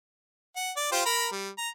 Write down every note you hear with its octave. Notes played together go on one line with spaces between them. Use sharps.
F#5
D5
F4 G4 C5
A#4 A#5 B5
G3
A#5